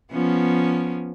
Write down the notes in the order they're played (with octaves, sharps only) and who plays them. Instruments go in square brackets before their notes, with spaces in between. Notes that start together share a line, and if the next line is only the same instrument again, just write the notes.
[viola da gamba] F3 B3 C#4